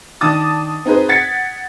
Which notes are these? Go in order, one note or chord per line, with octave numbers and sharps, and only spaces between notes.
D#3 D4 A5 D6 D#6 A6
C4 D#4 G#4 B4 C5
F#5 G#6 A6 B6 C#7